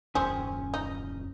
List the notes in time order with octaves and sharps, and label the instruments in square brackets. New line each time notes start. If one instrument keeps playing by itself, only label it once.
[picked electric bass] D#1 C#2 F#2 [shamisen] C4 G#4 [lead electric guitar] C#4 G#5
[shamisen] D#4